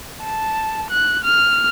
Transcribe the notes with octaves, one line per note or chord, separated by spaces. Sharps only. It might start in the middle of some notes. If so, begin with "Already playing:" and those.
A5
F#6
F6